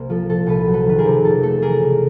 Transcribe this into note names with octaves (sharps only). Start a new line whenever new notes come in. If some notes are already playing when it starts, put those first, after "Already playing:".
Already playing: C2 A#3 C5
F3 A4
A#2 A4
C2 A4 B4
F#3
A4 B4
D#3 B4
G#4 A#4
C3
F2 A4
A3 A4
E3 G#4 A#4
C#3